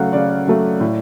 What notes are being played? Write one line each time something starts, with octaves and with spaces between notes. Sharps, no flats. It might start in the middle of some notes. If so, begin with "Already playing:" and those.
Already playing: C#3 F#3 A3 F5 F#5
C#3 D5
F#3 A3
A2